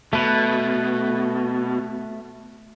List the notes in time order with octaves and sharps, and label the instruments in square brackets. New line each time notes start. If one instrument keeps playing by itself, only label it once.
[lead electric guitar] B2 [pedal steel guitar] A3 B4